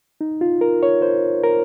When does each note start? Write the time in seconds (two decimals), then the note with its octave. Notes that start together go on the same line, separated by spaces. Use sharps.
0.21 D#4
0.41 F4
0.61 A#4
0.83 C#5
1.02 C5
1.43 A#4